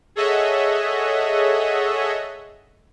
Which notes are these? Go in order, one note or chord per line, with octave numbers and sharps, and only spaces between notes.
G#4 A4 C#5 D#5 E5 F#5